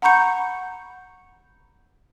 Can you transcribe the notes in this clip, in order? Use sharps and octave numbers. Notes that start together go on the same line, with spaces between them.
F#5 A#5 B5 C#6 G6 C#7